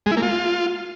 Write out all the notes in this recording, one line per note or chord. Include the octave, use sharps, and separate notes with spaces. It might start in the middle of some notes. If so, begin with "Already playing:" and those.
G#3
E4
A#3
F4